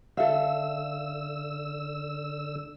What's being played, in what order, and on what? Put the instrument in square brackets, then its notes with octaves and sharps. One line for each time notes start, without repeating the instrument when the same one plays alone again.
[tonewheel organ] D3 E6 [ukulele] A4 E5 F5